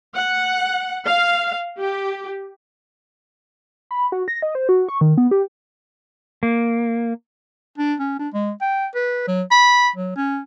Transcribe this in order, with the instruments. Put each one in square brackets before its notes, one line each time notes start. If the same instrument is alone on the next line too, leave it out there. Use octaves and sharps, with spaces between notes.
[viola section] F#5
F5
G4
[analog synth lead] B5
F#4
A#6
D#5
C5
F#4
C#6
D#3
B3
G4
[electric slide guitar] A#3
[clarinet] D4
C#4
D4
G#3
G5
B4
F#3
B5
F#3
C#4